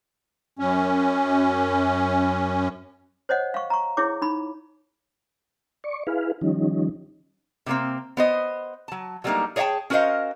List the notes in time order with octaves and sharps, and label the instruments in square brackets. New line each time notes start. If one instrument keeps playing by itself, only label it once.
[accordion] F#2 C#4
[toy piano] C5 C#5 D#5 F#5
F5 C#6
A#5 C#6
E4 G#4 C#5 D6
D#4 B5
[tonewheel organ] D5 C#6
E4 G#4 B4 F5
D#3 F3 G3 C#4 D#4
[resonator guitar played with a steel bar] C3 D#3 F#3 A#3 C4
B3 C5 D#5
F#3 A5
F#3 G3 A3 A#3 D4 D#4
G#4 C#5 D5 F5 G5 A5
C#4 F#4 A#4 C5 D#5 F5